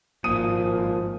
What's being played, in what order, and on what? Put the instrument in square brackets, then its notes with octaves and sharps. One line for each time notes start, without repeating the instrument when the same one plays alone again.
[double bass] G#1 [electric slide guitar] A#2 A#3 [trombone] F3 [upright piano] D#6 D#7